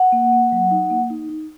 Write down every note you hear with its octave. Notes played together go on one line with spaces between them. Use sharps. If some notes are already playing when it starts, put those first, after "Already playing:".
Already playing: F#5
A#3
A#3
F#3
D#4
A#3
D#4
D#4